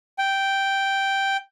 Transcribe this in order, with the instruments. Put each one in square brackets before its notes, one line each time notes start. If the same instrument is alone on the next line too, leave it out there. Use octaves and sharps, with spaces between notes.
[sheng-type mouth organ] G5